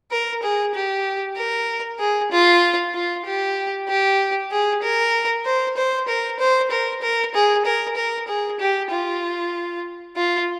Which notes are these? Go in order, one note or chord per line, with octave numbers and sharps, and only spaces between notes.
A#4
G#4
G4
A#4
G#4
F4
F4
G4
G4
G#4
A#4
C5
C5
A#4
C5
A#4
A#4
G#4
A#4
A#4
G#4
G4
F4
F4